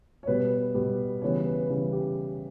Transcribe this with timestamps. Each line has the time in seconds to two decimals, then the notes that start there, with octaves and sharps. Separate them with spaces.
0.23 C#5
0.27 B2 G3 B3 B4
0.75 B2 G3 B3
1.21 C#3 E3 G3 B3 C#5
1.46 B4
1.70 C#3 E3 G3 B3
1.92 G4